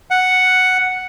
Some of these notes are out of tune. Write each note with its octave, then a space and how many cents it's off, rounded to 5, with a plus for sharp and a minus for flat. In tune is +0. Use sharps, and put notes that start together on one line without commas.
F#5 +0